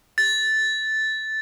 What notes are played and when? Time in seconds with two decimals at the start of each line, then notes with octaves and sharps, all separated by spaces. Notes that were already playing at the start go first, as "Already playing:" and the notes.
0.18 A6